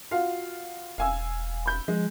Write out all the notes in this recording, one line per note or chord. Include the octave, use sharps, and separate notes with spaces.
F4 F#4 F5
E1 F5 G#5 E6
B5 G6
F3 G#3